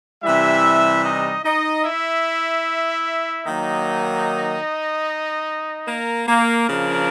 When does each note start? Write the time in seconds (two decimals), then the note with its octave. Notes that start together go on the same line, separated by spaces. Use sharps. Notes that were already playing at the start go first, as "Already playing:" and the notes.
0.23 C3 E3 G3 E4 E5
1.03 D#4 D#5
1.44 D#4 D#5
1.84 E4 E5
3.45 D#3 F#3 A#3 D#4 D#5
5.86 A#3 A#4
6.27 A#3 A#4
6.67 C#3 F3 A#3 D4